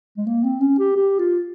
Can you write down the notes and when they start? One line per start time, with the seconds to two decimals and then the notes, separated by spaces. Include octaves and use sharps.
0.18 G#3
0.26 A#3
0.44 C4
0.60 C#4
0.79 G4
0.96 G4
1.19 F4